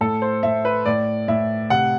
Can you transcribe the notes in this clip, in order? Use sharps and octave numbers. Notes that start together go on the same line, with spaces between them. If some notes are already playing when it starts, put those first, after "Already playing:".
A2 A4
C5
A2 E5
B4
A2 D5
A2 E5
C3 F#5